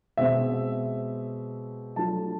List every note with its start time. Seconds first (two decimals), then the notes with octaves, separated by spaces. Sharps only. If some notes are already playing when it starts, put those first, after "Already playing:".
0.17 B2 G#3 C4 E5
1.96 F#3 A3 D4 F4 A5